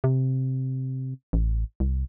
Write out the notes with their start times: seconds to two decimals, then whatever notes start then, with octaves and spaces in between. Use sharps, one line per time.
0.04 C3
1.33 A1
1.80 C2